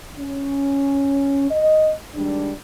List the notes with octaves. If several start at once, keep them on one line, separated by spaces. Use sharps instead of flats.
C#4
D#5
D#3 G3 G#3 D4